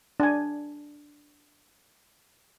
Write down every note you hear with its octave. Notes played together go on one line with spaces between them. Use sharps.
D4 G#5